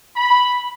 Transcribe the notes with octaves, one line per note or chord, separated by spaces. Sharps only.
B5